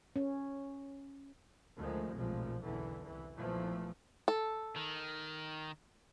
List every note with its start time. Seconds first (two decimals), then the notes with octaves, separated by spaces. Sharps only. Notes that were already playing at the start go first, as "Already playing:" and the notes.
0.16 C#4
1.76 D2 D#3 F3 G#3 A3
2.14 F1 B1 A#2 F3 G#3
2.62 F#1 B1 E2 D3 E3
3.05 C2 E3
3.35 B1 E2 A#2 E3 F3 A3
4.28 A4
4.76 D#3